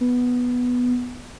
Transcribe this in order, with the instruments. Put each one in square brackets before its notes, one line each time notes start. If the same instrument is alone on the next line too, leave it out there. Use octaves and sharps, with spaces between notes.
[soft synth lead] B3